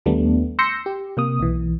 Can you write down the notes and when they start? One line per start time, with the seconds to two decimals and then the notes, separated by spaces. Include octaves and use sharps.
0.06 D#2 G3 A3 B3 D4
0.59 C6 E6 G6 A#6 C#7
0.86 G4
1.17 C3 A#3 D#6
1.40 B1 E3